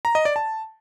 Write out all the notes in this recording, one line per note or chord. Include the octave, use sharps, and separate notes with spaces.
A#5
D#5
D5
A5